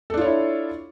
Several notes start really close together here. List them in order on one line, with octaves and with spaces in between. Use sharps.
A4 D4 F4 C#5 E4